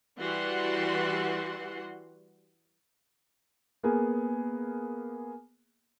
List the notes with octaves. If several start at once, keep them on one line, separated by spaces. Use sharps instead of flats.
E3 G3 F#4 F#5 C6
A#3 B3 G#4 A#4